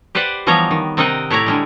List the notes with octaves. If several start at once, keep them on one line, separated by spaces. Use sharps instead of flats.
G4 B4 C5 D5 F#5
E3 F3 G3 B3 C#5 A#5
D#3
C3 C4 D#4 A#4 D#5 F#5
A2 E4 C#5 D5 A#5
D3 G3 G#3